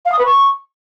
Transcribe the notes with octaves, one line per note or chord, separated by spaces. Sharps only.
F5
D#6
B4
C#6